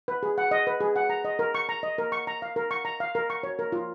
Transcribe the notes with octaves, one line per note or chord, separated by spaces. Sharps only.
B4
G#4
F#5
D#5
B4
G#4
F#5
A#5
D#5
A#4
C#6
A#5
D#5
A#4
C#6
A#5
F5
A#4
C#6
A#5
F5
A#4
C#6
C#5
A#4
F4